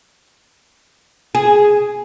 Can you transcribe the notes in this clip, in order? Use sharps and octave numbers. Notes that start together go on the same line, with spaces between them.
G#4